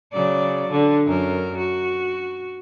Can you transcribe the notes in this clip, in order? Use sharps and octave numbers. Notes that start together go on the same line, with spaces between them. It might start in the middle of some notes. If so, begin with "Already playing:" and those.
C#3 F#3 D5
D3
F#2 A#4
F#4